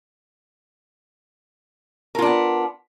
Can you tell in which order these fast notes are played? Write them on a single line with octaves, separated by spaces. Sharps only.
A#4 F4 D4 B3